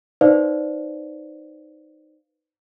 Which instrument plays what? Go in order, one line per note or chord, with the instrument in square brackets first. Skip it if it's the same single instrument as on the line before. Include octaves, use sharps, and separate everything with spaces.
[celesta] D#4 B4 C5 D5 F5